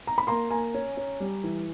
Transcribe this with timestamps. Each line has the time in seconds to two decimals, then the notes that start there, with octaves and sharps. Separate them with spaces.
0.07 A#5
0.18 B5
0.27 A#3 A#5 C6
0.50 A#3 G#5 A#5
0.74 C#4
0.97 C#4
1.20 G3
1.44 E3